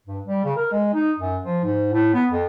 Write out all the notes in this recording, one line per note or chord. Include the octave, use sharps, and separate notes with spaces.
G2
G3
C#3
A#4
G#3
D#4
F#2
F3
G#2
A2
B3
F2